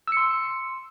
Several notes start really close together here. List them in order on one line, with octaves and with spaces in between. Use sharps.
E6 C#7 C6